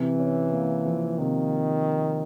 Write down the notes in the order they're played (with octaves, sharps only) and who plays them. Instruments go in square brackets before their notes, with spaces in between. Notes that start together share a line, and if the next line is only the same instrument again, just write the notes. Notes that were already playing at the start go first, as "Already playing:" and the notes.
Already playing: [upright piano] C3 [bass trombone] E3
[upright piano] C#4
A#3
F3
[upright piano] C3 [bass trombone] D#3